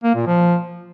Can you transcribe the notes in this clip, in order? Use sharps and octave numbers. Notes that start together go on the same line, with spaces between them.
A#3
A#2
F3